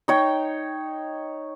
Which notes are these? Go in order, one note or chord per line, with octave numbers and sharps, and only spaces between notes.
D#4 C#5 G5